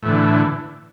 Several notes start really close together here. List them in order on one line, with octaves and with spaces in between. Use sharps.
A2 E3 D3